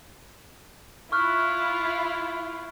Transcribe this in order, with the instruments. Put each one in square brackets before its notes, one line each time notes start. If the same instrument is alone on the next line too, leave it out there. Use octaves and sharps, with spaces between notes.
[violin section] E4 F4 [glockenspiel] C#6 F6 F#6